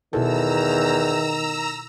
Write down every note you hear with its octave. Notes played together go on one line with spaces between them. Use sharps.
E2 B2 D#3 E4 A4 A#5 E6